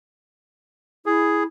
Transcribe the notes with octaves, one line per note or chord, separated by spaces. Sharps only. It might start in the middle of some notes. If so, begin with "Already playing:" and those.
E4 G#4